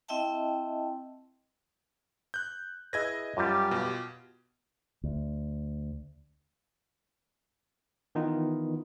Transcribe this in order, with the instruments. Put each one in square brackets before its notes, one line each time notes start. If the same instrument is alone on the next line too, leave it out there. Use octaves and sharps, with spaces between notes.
[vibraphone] C4 E4 D#5 E5 G5 A5
[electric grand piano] F#6 G6
[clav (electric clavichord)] E4 G#4 B4 [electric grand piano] D#5 G#6 A#6
[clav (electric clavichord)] F#2 G3 [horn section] F4 G4
[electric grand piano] B2
[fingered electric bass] D2
[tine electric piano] D#3 E3 B3 D#4 F4